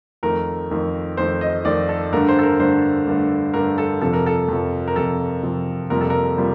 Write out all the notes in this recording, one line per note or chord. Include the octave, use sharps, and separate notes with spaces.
F2 D#3 A3 A#4
F2 D#3 A3
F2 D#3 A3 C5
D#5
F2 D#3 A3 D5
A4
G2 D3 A3 A#4
C5
A4
A#4
G2 D3 A3 C5
G2 D3 A3
G2 D3 A3 A#4
A4
F2 C3 F3 A4
A#4
A4
F2 C3 F3
A#4
F2 C3 F3 A4
F2 C3 F3
F2 C3 G3 A#3 F4 A#4
A4
A#4
C3 G3 A#3 F4